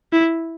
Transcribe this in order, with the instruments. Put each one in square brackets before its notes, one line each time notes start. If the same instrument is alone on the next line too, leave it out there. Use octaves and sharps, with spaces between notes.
[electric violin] E4